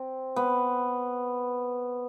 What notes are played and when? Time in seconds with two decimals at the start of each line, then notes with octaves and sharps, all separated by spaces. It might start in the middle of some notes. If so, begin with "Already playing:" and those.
Already playing: C4
0.36 B3